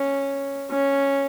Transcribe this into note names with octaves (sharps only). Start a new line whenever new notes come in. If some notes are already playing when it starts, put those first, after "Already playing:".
Already playing: C#4
C#4